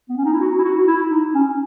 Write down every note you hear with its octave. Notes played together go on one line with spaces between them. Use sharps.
B3
C#4
D#4
E4
F#4
E4
F#4
E4
D#4
C#4